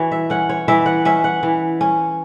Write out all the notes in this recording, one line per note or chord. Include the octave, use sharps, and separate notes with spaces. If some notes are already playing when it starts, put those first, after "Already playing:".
Already playing: E3 F#4 C#5
E5
C#4 F#5
C#5
E3 E5
F#5
C#4 E5
F#5
E3
C#4